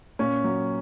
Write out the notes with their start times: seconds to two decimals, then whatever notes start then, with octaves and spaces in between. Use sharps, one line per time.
0.19 A#2 C#4
0.44 F#3